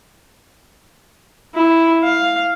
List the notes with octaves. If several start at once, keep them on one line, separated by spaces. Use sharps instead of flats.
E4
F5